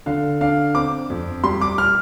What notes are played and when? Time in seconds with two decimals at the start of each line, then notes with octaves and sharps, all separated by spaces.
0.06 D3 F5
0.41 D4 F5
0.75 C4 D6
1.10 F2
1.44 G3 C6
1.61 D6
1.78 F6